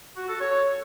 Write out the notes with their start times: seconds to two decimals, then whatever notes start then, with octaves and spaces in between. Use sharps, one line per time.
0.17 F#4
0.28 A4
0.40 C#5